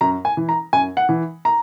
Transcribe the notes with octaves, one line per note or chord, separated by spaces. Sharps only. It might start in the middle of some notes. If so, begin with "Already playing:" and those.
F#2 A#5
G#5
E3
A#5
F#2 G#5
F#5
E3
A#5